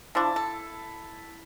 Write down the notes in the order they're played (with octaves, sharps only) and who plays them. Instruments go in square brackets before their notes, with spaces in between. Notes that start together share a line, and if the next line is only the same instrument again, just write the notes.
[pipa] F3 D4 [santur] E4 A5
[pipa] A4